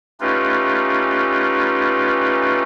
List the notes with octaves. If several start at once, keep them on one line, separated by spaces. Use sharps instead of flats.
A3 C#4 D#4 F4 G4 B4